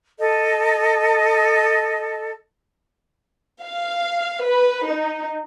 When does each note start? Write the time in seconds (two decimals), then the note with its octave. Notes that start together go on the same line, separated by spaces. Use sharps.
0.19 A4 D#5
3.65 F5
4.43 B4
4.88 D#4